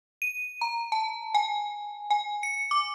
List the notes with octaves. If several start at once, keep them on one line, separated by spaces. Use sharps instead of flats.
D#7
A#5
A5
G#5
G#5
C#7
D6